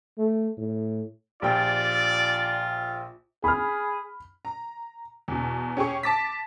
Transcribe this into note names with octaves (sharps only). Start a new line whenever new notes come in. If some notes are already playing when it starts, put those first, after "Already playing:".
A3
A2
A#1 F4 G4 D5 G5
G#4 B5 F6
A#5
E2 B2
C#4 G4 G#4 C#6
A5 D6 A6 B6